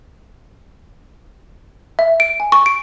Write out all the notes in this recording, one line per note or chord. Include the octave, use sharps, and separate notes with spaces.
E5
D7
G#5
C#6
D7